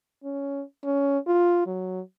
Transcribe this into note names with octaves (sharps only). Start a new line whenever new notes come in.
C#4
C#4
F4
F#3